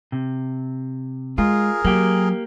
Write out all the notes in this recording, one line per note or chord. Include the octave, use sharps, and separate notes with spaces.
C3
G#3 F4 G#4 A#4
F#3 A#3 G4